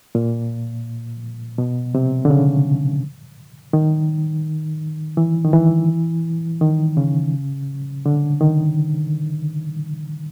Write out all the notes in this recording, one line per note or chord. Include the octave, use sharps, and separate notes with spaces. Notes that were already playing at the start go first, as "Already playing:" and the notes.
A#2
B2
C3
D3
C#3
D#3
E3
D#3
E3
D#3
C#3
D3
D#3